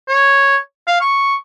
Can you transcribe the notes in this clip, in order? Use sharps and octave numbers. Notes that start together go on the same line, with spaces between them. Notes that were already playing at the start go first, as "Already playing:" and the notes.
C#5
F5
C#6